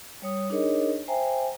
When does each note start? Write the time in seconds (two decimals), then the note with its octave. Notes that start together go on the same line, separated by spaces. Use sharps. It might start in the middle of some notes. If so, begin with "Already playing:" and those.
0.22 G3 C#5 D#6
0.50 D4 D#4 G#4 A#4 C#5 D#5
1.08 C5 E5 G5 G#5 A#5